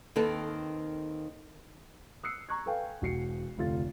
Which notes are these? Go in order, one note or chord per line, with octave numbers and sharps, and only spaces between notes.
D#2 D#3 C4 A4 B4
D#6 E6 F#6 C7 C#7
A#5 C#6 F#6 G#6
A4 B4 F5 G5 G#5
E1 F#4 C7 C#7
F1 D2 F4 A6